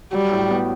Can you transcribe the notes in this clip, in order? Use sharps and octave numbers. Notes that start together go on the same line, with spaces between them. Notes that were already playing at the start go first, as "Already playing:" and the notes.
F#3 G3
A2
B3